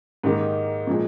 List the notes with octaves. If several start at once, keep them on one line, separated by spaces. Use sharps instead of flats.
G#2 D#3 A#3 D#4 G4
A#2 F3 G#3